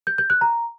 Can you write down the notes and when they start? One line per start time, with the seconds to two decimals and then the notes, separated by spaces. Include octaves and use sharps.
0.07 G6
0.18 G6
0.30 F#6
0.41 A#5